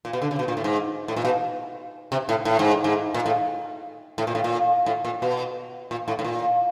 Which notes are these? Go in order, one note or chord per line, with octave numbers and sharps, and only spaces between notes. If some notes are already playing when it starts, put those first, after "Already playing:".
A#2
B2
D3
C#3
B2
A#2
A2
G#2
A2
A#2
B2
C3
A2
A2
G#2
G#2
A#2
A2
A2
A#2
A2
A#2
A2
A#2
B2
A#2
A2
A2
A#2